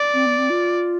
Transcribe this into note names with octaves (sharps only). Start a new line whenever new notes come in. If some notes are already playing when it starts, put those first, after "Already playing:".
Already playing: D5
C4
B3
C4
F4